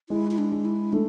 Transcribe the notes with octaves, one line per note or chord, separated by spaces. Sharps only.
G#3 E4
E4
D4
G#3
E4
A3 D4